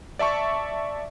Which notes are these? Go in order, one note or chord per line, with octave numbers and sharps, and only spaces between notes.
D5 E5 A5 C#6